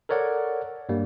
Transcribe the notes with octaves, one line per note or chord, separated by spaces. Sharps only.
A4 A#4 C#5 D5 F#5
G2 G3 A#3